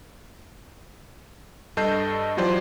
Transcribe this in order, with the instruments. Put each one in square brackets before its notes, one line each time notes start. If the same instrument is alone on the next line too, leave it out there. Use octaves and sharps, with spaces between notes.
[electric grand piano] G2 A4 D#5 A5 G6 C7
E3 F#3 F4 G4 C5 D5